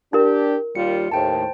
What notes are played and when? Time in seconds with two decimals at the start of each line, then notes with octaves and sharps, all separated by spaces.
0.13 D4 E4 G4 A#4
0.75 D#2 G3 F4 C#7
1.11 D#2 A2 C5 G5 A5